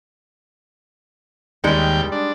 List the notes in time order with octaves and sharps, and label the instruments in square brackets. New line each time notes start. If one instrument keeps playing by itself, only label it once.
[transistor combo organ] D#2 G5 [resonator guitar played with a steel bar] G3 G#3 D#4
[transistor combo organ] D4